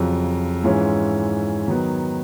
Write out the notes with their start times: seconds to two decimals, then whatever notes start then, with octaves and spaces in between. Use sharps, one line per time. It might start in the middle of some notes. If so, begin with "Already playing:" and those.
Already playing: F2 C#3 F#3
0.64 G#2 E3 G#3 C#4 F4
1.68 D#3 F#3 B3